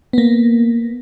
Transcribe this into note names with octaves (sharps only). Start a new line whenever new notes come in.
A#3 B3